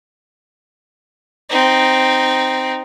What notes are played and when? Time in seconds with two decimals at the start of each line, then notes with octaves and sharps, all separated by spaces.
1.50 C4 D#4